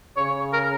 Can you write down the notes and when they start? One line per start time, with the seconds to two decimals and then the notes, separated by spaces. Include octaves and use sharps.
0.17 C#3 C#5
0.53 A#4